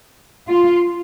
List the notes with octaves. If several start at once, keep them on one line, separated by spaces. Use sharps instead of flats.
F4